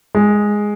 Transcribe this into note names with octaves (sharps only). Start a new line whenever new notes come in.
G#3